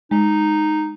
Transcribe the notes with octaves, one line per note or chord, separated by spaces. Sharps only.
G#3 D#4